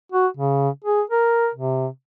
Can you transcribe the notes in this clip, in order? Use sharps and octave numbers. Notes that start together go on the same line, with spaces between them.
F#4
C#3
G#4
A#4
C3